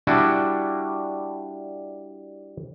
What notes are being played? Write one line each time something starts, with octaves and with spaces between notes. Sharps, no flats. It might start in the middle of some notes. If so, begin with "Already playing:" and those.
G3 D4 E4 F#4